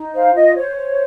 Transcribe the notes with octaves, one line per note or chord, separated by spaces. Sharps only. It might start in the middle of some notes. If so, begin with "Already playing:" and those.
Already playing: D#4
C5 F5
F4 D#5
C5 C#5
C5